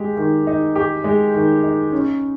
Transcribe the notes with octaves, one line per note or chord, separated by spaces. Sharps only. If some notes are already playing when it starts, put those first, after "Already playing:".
Already playing: G#3 G4
D#3
D#4
G4
G#3
D#3
D#4
C#4